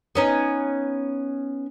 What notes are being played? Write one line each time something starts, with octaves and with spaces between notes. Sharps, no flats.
B3 C#4 D#4